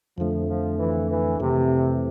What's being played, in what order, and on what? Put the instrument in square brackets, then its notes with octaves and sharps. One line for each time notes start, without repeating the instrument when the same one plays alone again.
[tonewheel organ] F2 D3 A3 [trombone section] F3
[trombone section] F3
E3
E3
[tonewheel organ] F2 E3 A3 C4 [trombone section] C3